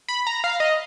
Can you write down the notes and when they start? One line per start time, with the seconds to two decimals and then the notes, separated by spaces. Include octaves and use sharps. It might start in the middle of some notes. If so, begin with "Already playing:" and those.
0.08 B5
0.27 A#5
0.44 F5
0.60 D#5